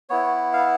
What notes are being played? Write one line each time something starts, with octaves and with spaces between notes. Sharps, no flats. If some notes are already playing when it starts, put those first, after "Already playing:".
B3 E4 C#5
F5